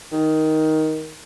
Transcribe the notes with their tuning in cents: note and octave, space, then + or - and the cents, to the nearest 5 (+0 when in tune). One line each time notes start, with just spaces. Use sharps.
D#3 +10